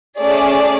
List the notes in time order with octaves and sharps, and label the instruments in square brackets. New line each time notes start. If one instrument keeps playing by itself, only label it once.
[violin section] A3 C#4 G#4 D5